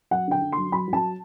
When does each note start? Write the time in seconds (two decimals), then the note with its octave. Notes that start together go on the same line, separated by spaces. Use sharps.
0.11 F#3 F#5
0.28 D3 G5
0.42 D3
0.52 C6
0.58 F#3
0.72 F#3 B5
0.88 F#3
0.93 A5